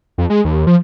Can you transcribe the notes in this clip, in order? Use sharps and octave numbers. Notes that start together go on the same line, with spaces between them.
F2
G#3
D#2
F3